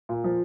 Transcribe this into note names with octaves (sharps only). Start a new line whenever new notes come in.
A#2
F3